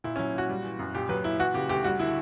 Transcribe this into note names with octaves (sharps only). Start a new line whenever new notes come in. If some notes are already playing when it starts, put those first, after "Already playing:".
A#2 E4
F#3 C#4
A#2 F#4
G3
E3
F#2
A#2 G4
F#3 B4
A#2 E4
E3 F#4
C#3 G4
D2 G4
G3 F#4
D3 E4